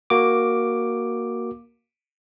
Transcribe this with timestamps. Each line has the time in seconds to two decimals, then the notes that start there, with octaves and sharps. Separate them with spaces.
0.10 A#3 F#4 D6